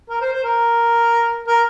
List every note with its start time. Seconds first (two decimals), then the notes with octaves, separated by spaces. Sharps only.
0.09 A#4
0.21 C5
0.33 C5
0.44 A#4
1.47 A#4